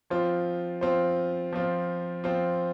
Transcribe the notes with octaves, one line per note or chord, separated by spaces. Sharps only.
F3 C4 F4 C5
F3 C4 F4 C5
F3 C4 F4 C5
F3 C4 F4 C5